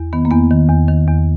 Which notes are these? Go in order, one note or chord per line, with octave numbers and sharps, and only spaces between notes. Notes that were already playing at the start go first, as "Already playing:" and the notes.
Already playing: E2
D#3 B3
A#3
E2 B3
D#3
E2
D#3
E2